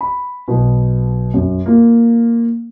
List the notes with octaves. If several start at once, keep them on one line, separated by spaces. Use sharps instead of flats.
B5
B1 B2
F#2
A#3 F4